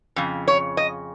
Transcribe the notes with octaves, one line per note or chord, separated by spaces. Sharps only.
F2 C#3
C#5
D#5